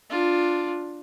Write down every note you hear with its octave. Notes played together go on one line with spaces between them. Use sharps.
D4 F4